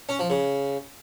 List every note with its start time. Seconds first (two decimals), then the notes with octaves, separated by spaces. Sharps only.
0.09 C#4
0.19 F3
0.30 C#3